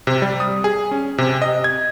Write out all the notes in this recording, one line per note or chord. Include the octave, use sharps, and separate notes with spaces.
C3
G3
D#6
G#4
C#4
C3
D#5
G#6